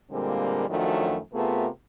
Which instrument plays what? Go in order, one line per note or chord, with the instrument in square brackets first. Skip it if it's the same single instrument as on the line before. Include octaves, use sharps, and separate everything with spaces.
[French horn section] A#2 D3 G3 G#3 A#3 C4
F#2 D#3 F3 F#3 A3 D4
C3 A3 B3 F4 G#4 A#4